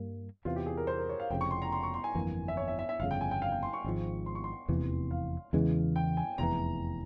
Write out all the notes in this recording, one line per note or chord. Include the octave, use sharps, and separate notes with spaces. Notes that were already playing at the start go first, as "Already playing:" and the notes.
Already playing: G2 G3 A#3
E2 C3 E3 F4
G4
G#4
A#4
C5
A#4
C#5
F5
F1 F2 C#3 G5
C#6
C6
A#5
C6
C#6
C6
G#5
G1 F2 E3 A#3
E5
C#5
E5
E5
E5
G1 F2 C#3 F5
G5
G#5
G5
F5
G5
C6
C#6
G#1 G#2 F3
C6
C#6
C6
F1 E2 C3 E3
F5
E2 C#3 E3 G#3
G5
G#5
F1 E2 E3 A#5